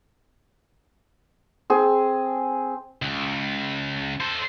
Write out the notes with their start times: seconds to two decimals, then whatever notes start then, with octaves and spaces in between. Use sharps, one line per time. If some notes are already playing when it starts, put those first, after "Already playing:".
1.70 C4 G#4
3.02 C#2
4.20 A4 C5